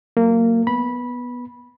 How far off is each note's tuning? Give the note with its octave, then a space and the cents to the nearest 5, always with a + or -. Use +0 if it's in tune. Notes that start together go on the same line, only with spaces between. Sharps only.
F#3 +0 A#3 -20
B3 -10 B5 -15